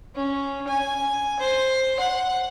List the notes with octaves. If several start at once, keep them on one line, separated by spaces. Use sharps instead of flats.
C#4
G#5
C5
F#5